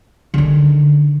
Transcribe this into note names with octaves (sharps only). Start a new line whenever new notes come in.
D3 D#3